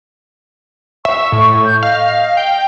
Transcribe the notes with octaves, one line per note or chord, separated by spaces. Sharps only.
E5 C#6
A2
G6
D#5 F5
G5